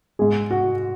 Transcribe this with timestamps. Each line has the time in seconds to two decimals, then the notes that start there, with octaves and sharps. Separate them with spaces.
0.19 G#2 G#3 G#4
0.51 F#4